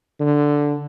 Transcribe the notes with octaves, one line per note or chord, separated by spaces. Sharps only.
D3